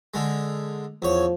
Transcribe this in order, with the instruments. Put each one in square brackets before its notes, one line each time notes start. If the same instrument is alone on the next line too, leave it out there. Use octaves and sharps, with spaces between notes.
[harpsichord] D3 G#3
[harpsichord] E2 C#5 [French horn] F3